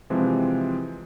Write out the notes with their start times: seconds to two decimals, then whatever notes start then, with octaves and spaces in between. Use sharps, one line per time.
0.10 C3 E3 F3 G#3 C4